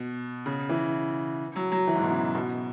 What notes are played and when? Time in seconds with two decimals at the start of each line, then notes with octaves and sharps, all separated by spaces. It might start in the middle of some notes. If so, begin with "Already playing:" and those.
Already playing: B2
0.46 C#3
0.69 E3
1.56 F#3
1.72 F#3
1.87 E3
1.96 G#2
2.03 B2
2.11 C#3
2.34 B2